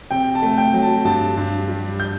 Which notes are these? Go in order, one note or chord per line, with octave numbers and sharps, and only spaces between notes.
C3 G5
A5
A3
G5
F#3
A5
G2 A5
G2
G3
G6